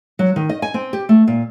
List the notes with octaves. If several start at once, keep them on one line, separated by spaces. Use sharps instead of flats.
F#3
D#3
D#5
G#5
C4
G4
A3
A#2